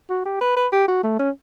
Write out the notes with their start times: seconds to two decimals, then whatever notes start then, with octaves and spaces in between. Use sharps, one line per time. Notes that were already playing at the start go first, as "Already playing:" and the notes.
0.10 F#4
0.26 G4
0.41 B4
0.56 B4
0.72 G4
0.88 F#4
1.04 A3
1.19 C#4